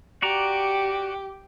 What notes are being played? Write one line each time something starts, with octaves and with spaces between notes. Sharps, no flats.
F#4 G4 D5 A#5